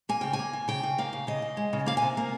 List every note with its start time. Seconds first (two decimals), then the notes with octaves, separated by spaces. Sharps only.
0.09 A#3 G#5
0.21 C#3 G5
0.33 G#5
0.39 A#3
0.53 C#3
0.68 C#3 G5
0.83 C#3
0.98 A#3 F5
1.13 C#3
1.27 C#3 D#5
1.42 C#3
1.57 G#3
1.73 C#3
1.86 A#3 F5
1.97 G#5
2.02 C3
2.17 A#3